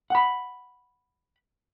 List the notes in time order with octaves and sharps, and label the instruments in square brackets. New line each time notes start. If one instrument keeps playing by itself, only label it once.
[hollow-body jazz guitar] F#5 B5